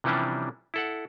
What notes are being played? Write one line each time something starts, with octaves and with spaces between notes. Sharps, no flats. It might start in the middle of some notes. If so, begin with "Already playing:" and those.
C3 E3 F3 G3 C#4 D4
E4 A4 F#5